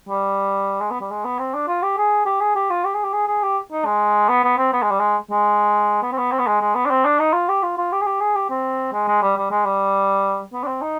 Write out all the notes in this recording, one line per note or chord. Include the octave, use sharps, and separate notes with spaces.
G3
G#3
B3
G3
G#3
B3
C4
D4
F4
G4
G#4
G4
G#4
G4
F4
G4
G#4
G4
G#4
G#4
G4
D#4
G#3
B3
B3
C4
B3
G#3
G3
G#3
G#3
B3
C4
B3
C4
B3
G#3
G#3
B3
D4
C4
D4
D#4
F4
G4
F4
F4
G4
G#4
G4
G#4
G4
C4
G#3
G#3
G3
G3
G#3
G3
B3
D4
C4
D#4